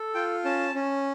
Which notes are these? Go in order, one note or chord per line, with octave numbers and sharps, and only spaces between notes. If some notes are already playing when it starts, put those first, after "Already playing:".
Already playing: A4
F4 G5
C#4 A5
C#4